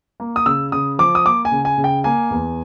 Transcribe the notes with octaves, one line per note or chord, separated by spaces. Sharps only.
A#3
D#6
C#3 E6
C#3 D#6
F3 D6
D#6
A#3 D6
G#5
C#3
G#5
C#3
G5
A#3 G#5
E2